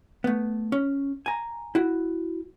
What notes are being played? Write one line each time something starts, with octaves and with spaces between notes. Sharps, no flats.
A3 B3
C#4
G#5 A#5
E4 F#4